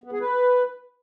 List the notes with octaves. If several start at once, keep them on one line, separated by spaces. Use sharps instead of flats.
B3
G#4
B4